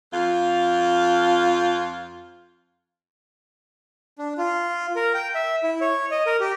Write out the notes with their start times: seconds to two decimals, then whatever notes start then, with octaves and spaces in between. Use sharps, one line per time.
0.14 F2 F4
4.19 D4
4.38 F4
4.96 A#4
5.14 G5
5.35 E5
5.63 E4
5.81 C#5
6.11 D#5
6.26 A#4
6.40 G4